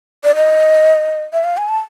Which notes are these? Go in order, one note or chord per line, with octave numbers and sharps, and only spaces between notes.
D5
D#5
E5
F5
G#5
A5